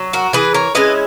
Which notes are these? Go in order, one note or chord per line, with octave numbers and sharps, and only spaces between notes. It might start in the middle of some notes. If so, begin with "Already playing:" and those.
Already playing: F#3
F#4 A#4
E3 G#4 B4
A#4 C#5
G#3 C#4 E4 B4 D#5